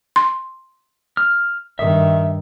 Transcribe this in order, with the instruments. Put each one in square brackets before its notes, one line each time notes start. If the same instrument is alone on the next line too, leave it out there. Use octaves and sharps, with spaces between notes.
[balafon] C6
[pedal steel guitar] F6
[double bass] G2 D#3 [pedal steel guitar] E5